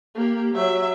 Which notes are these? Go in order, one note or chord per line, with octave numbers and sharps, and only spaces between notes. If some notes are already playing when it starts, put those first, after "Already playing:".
A#3 G4
F#3 E5